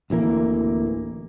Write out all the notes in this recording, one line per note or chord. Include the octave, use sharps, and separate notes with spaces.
D1 A1 E3 A#3